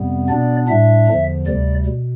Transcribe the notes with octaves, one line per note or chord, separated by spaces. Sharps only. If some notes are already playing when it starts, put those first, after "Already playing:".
Already playing: F2 C3 G3 B3
B2 B3 D4 D5
A2 G3 D4 E5
E2 D3 F3
D2 C3 G3 D5
B2